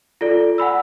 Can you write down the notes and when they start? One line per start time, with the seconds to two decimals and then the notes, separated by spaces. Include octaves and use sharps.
0.21 F4 A4 D5
0.58 F#5 G#5 B5 E6